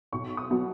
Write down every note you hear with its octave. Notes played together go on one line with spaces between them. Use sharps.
B1 C#6
D#6
B2 F#3